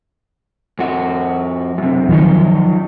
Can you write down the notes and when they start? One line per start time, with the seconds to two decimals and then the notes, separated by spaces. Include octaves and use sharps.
0.79 F2 F#4
1.78 F#2 C3
2.09 F#2 D#3 F3 F#3 D#4